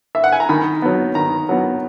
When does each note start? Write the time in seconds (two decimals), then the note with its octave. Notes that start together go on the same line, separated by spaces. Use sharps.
0.15 E5
0.24 F#5
0.32 G#5
0.40 A#5
0.49 D#3 B5
0.82 F#3 B3
1.15 D#3 A#5
1.49 F#3 B3